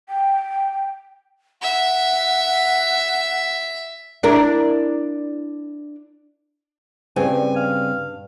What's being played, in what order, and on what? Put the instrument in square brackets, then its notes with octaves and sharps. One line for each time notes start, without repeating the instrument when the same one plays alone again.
[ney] G5
[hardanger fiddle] E5 [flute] F#5
[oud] D4 E4 A#4
[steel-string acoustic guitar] G2 [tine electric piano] C#3 G3 C4 [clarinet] G#5
[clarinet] F5